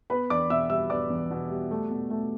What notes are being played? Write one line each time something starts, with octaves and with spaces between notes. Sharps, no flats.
B3 B4 B5
E2 D5 D6
B2 E5 E6
G3 E5 E6
B3 D5 D6
E2
B2
G3
A3
B2
A3